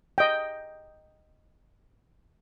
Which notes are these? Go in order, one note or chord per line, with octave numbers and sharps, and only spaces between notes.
D#5 G5